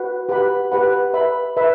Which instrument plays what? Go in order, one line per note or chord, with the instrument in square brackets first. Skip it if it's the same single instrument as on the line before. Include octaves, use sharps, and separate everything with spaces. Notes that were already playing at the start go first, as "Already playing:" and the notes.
Already playing: [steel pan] F#4 B4 F#5
G4 B4 F#5 B5
G4 B4 F#5 B5
B4 E5 B5
B4 E5 B5